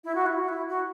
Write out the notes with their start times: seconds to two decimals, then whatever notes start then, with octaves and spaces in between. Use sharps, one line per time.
0.04 E4
0.15 F#4
0.26 E4
0.38 F#4
0.48 E4
0.68 F#4